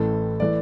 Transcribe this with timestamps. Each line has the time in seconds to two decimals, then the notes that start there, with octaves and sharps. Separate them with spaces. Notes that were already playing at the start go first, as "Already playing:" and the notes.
Already playing: A1 A2 E3 A4
0.40 E3 A3 D5